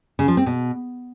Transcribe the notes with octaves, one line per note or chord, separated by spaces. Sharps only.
C#3
F3
C4
B2